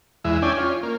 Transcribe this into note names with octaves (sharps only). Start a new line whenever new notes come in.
E2 G#3 E5
C#4 D4 D5 G5 G#5
C#4 F4
A#3